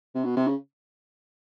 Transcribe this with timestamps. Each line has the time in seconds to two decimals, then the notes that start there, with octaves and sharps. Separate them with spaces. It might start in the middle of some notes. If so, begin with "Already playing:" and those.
0.15 C3
0.25 B2
0.37 C3
0.47 C#3